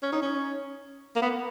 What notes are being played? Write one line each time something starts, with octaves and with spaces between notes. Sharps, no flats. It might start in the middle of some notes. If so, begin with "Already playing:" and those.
C#4
D#4
C#4
A#3
B3